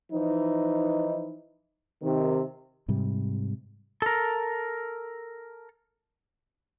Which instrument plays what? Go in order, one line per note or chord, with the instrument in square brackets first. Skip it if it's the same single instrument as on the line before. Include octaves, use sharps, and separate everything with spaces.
[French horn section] E3 F3 D#4
C3 D#3
[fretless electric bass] G#2 C3 G3
[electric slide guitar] A4 A#4